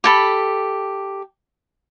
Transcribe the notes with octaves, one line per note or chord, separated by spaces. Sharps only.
G4 A4 B5